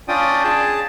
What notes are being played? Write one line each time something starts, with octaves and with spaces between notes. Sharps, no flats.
C#4 D4 F4 D5 G5 D#6
G#4 A5